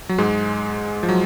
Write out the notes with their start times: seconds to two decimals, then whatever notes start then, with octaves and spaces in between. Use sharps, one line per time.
0.09 F#3
0.18 G#2 G#3
1.03 F3
1.09 F#3